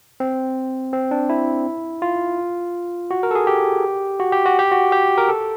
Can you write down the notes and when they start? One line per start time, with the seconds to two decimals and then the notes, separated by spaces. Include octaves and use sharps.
0.20 C4
0.93 C4
1.11 D4
1.29 E4
2.02 F4
3.11 F#4
3.23 A#4
3.31 A4
3.35 G#4
3.47 G4
4.20 F#4
4.32 G4
4.46 F#4
4.59 G4
4.72 F#4
4.92 G4
5.18 A#4
5.29 A4